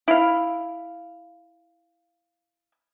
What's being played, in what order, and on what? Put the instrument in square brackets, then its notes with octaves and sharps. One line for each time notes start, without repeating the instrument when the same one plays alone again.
[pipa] E4 F5